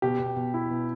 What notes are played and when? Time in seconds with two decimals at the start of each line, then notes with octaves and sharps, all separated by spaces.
0.02 B2 G4
0.19 B2
0.36 B2
0.54 E4
0.70 B2